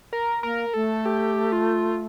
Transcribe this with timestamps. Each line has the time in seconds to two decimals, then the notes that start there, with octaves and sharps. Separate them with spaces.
0.13 A#4
0.43 A#3 A#4
0.74 A3 A4
1.05 G4
1.52 F4